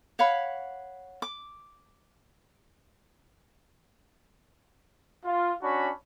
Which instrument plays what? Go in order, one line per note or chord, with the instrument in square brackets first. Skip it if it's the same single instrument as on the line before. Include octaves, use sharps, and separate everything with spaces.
[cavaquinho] C#5 F5 F#5 B5
D6
[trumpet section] F4
C#4 D4 F#4 A5 B5